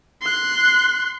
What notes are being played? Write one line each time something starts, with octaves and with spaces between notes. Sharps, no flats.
C6 F#6